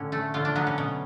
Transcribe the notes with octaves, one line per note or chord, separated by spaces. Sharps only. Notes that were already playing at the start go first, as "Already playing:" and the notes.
Already playing: A2 D3 C#4
A3
D3 F4
D4
F#3 B3
C#4
B2